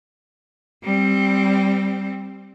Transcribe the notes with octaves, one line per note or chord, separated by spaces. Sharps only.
G3 C4